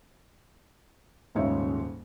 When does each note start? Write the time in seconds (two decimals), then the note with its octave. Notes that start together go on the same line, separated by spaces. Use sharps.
1.35 D#1 G#2 C#3 D#4 C#5 E5